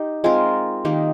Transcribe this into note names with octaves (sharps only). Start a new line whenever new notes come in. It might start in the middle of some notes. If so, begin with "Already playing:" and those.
Already playing: D#4 G4
G#3 C4 F4 A#4
D#3 A#3 D#4 G4